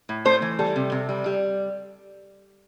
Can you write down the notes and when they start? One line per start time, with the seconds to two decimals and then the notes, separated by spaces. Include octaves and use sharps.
0.09 A2
0.25 A3 C5
0.42 E3
0.59 G3 A4
0.76 C3
0.92 C3
1.09 G3
1.26 G3